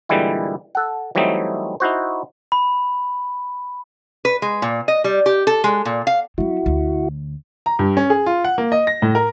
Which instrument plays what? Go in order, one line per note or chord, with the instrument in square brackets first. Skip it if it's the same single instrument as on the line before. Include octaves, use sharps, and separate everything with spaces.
[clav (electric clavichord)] A#2 D3 E3 G3 G#3 E4
A4 F#5
E3 F#3 G3 A3 C4 D#4
D#4 E4 F#4 C5
[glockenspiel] B5
[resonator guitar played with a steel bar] B4
G#3
A#2
D#5
G3
G4
A4
G#3
A#2
F5
[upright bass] F#3 C4 [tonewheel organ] E4 F#4
[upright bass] D2
[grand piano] A#5
G2
C#4
G#4
F4
F#5
A#3
D#5
A#6
A2
A#4